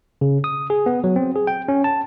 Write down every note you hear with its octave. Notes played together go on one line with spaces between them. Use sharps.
C#3
D#6
G#4
B3
F#3
C4
G#4
G5
C#4
A5